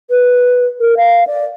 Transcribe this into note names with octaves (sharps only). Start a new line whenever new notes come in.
B4
A#4
F5
D5